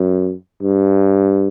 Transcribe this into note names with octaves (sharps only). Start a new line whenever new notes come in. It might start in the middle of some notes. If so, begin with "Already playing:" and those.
Already playing: F#2
G2